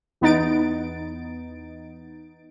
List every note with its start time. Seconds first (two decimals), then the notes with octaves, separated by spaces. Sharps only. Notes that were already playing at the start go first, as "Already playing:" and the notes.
0.21 E2 B3 D#4 A6 D7